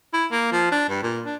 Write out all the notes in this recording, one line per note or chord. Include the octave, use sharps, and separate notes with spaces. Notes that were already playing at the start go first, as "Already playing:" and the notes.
E4
A#3
F3
D4
G2
A#2
D4